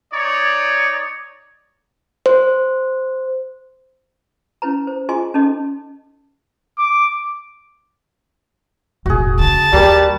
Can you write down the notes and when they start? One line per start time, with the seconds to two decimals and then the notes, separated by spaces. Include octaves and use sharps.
0.12 D#4 C#5 D5
2.26 C5
4.62 C#4 E4 B4 A#5
4.87 C5
5.09 F4 G#4 D#5 G#5 C6
5.34 C#4 D#4 A4 D#5
6.78 D6
9.06 E1 A2 F#4 G#4
9.40 C#3 A5
9.73 D#2 G3 F#4 G4 A#4